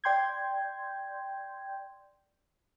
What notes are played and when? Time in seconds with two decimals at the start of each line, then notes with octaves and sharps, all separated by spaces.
0.04 D5 G5 C6 G6 G#6